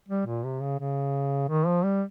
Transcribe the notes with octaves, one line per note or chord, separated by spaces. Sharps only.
G3
A#2
C3
C#3
C#3
D#3
F3
G3